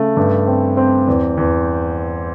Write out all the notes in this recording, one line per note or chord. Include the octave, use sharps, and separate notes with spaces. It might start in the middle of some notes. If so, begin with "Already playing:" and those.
Already playing: C#3 A3
G2
C4
C4
E2
E2